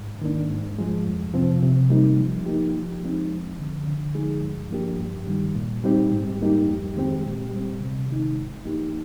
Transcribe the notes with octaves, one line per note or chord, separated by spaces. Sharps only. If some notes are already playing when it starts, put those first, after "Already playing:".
Already playing: G#2
D#3 A#3 D4
G#2
F3 G#3
F2
C3 F3 C4
C3
G3 A#3 D#4
F3
A#3 D#4 G4
F3
G#3 C4 D#4
F2
D3 F3
D3
F3 G#3 D#4 G#4
G2
F3 A#3 D4 G4
G2
D#3 G3
A#2
G3 C4 D#4 G4
G#2
G3 A#3 D#4 G4
F2
D#3 G#3 C4 G4
A#2
G3 C4
C3
D#3 G#3 D#4
G#2
F3 A#3 D#4 G4